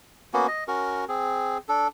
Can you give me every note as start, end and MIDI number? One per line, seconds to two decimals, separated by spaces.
0.34 0.47 58
0.34 0.47 59
0.34 0.47 61
0.34 0.47 66
0.48 0.64 75
0.68 1.05 61
0.68 1.05 66
0.68 1.05 70
1.09 1.58 60
1.09 1.58 68
1.69 1.88 62
1.69 1.88 69